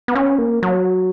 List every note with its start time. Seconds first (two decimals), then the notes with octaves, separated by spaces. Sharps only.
0.08 B3
0.15 C#4
0.38 A#3
0.63 F#3